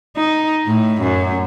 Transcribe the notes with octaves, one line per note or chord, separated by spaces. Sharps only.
D#4
A2
F#2